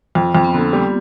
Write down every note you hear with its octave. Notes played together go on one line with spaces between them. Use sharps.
F2 F4
F2 C4
B3
D3 A#3
G3